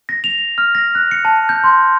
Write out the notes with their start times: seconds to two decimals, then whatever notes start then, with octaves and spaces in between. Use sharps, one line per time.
0.09 A#6
0.24 F7
0.58 F6
0.75 A#6
0.95 F#6
1.11 C#7
1.25 A5
1.49 G6
1.64 C6